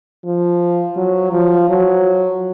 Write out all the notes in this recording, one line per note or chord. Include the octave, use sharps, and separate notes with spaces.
F3
F#3
F3
F#3